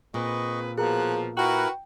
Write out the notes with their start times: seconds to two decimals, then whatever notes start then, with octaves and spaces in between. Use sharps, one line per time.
0.14 A#2 C4 G#4 B4 D#5 C#6
0.78 B2 F3 G#4 A#4 A#5 F#6
1.37 E4 F#4 A#4 B4 G5